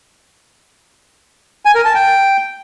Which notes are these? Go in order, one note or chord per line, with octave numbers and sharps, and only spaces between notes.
G#5
A#4
A5
G5